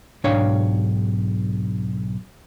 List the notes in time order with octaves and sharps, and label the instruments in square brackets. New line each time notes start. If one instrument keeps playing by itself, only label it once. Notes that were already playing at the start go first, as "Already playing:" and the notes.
[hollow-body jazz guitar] B1 G#2 D4 C#5 F5 G5